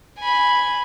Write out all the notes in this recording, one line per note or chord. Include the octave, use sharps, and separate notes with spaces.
G#5 B5